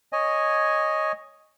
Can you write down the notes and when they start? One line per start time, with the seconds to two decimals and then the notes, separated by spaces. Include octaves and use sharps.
0.12 C#5 D#5 G#5